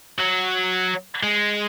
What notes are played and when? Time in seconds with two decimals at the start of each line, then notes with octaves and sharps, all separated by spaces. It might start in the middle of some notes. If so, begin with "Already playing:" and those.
0.18 F#3
1.23 G#3